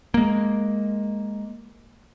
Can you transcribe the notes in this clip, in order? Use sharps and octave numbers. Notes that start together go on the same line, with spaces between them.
G#3 A#3